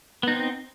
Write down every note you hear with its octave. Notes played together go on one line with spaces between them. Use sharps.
B3 C4 D#4